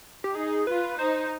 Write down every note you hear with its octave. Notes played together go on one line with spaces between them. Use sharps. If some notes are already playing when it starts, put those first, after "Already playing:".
G4
D#4 G#4
F4 B4
D#4 C5